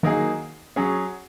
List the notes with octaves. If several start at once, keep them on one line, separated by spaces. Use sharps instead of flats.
D#3 F#3 A#3 D#4 G#4
F#3 C#4 G#4